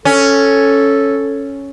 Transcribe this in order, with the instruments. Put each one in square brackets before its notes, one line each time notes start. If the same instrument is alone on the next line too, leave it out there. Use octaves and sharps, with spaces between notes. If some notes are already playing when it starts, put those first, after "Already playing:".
[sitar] C#4 [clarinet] A4